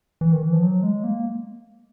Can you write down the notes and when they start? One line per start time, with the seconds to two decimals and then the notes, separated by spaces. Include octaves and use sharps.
0.21 E3
0.32 D#3
0.43 E3
0.53 F3
0.63 F#3
0.83 G#3
1.04 A#3